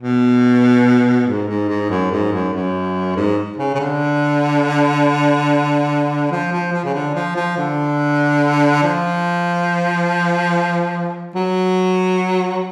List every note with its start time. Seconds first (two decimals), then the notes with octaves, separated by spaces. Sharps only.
0.02 B2
1.27 G#2
1.48 G#2
1.69 G#2
1.90 F#2
2.11 G#2
2.32 F#2
2.54 F#2
3.16 G#2
3.58 C#3
3.75 C#3
3.79 D3
6.31 F3
6.52 F3
6.72 F3
6.85 C#3
6.94 D3
7.15 F3
7.36 F3
7.57 D3
8.83 F3
11.35 F#3